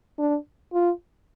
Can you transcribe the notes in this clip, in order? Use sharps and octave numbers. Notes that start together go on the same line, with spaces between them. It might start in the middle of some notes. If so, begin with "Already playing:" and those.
D4
F4